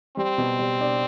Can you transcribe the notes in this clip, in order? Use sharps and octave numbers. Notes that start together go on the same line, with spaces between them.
G3 C4
B2
G3
D4